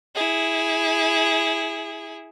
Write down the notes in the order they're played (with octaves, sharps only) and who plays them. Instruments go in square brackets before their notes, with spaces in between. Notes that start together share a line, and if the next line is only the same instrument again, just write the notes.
[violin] E4 G#4